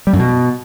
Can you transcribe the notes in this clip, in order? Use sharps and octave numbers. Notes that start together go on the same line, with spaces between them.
G3
F#2
B2